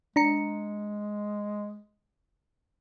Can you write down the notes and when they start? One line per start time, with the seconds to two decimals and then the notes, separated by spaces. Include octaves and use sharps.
0.16 G#3 D4 A#5 C#7